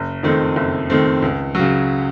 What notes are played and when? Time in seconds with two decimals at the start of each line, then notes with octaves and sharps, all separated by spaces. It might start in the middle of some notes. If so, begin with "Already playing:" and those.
Already playing: F#1
0.23 F2 D#3 A3 C4
0.56 F#1
0.90 F2 D#3 A3 C4
1.22 C#2
1.55 C#3 F#3